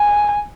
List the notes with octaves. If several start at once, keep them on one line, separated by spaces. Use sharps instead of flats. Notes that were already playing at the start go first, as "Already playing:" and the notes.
Already playing: G#5